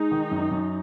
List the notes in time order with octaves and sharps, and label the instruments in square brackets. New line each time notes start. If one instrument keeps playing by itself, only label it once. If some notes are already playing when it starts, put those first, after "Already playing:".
Already playing: [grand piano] G#3 [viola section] D#4
[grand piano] D#3
F#2
F#2